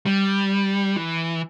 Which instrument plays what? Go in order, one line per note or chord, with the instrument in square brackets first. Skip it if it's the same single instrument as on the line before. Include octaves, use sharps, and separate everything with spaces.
[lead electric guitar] G3
E3